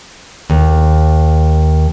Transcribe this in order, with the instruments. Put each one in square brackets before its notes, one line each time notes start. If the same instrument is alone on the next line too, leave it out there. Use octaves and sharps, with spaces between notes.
[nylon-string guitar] D#2